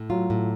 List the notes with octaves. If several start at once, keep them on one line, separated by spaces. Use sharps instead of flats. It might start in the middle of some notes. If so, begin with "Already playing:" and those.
Already playing: A2
F#3 F4
A2